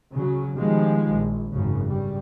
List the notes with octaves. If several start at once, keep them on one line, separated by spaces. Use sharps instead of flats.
C#3 F#3
B2 D#3 F3 G3 G#3
A#1
G#1 F#2 C#3
G2 C#3 G3